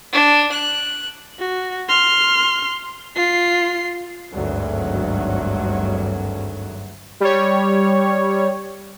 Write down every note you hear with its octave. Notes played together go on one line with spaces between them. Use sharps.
D4
F#6
F#4
C6 F6
F4 C7
G#1 D2 G2 F#3
G3 C#5